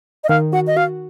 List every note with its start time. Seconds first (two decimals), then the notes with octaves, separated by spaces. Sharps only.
0.24 D#5
0.29 D#3 F5
0.53 F#4 F#5
0.67 D#5
0.76 F#4 F5